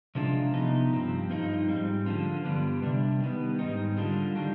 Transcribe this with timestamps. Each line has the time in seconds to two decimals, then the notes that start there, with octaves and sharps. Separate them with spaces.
0.15 C3 F3 G#3 D4 F4
0.54 C3 F3 B3 D#4
0.92 G2 F3 C4
1.30 G2 F3 C4 D#4
1.68 G#2 G3 C4
2.06 D3 F3 B3 D4 F4
2.44 G2 D3 G3 B3 D4
2.82 C3 G3 D4
3.20 D#3 G3 B3
3.59 G#2 G3 C4 D#4
3.97 D3 G3 D4 F4
4.35 D#3 G3 D4